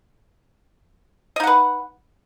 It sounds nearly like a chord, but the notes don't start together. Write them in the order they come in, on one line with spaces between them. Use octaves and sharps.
D#5 D#4 F#5 B4